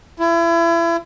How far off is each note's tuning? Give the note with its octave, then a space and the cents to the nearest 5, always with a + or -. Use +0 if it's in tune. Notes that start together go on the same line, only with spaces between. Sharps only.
E4 +35